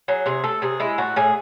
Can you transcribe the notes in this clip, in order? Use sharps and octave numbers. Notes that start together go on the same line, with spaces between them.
F#3 G#4
C3 G#4
A3 A4
C3 G#4
G#3 E4
A2 F#4
A2 G#4